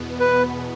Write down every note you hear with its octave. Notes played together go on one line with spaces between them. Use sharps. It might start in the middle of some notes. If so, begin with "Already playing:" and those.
Already playing: E2 B2 B3
B4